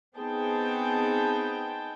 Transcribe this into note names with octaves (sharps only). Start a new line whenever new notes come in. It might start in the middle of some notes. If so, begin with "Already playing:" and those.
B3 C4 D#4 G#4 G5 A5